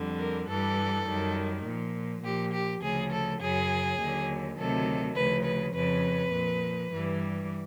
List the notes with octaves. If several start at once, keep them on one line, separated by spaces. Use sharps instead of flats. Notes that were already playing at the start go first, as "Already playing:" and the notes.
Already playing: F2 D3 G3
A#4
G2 E3 G3 A4
F#2 D#3 G3
A#2 F3
A#2 F3 G4
G4
D2 C#3 F3 G#4
A4
F#2 C#3 F#3 G#4
D#2 D3 F#3
D2 C3 D#3 F#3 A4
D2 C#3 F3 B4
B4
F2 C#3 F3 B4
A#2 F3
G2 E3 G3